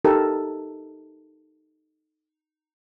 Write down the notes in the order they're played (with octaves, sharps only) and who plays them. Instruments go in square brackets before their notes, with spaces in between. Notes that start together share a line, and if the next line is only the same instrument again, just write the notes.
[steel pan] D#4 G4 A4 A#4